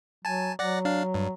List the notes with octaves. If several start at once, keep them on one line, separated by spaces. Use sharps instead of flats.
F#3 G#5 A5
F#3 D5 F#5 A#6
D4 F5
G2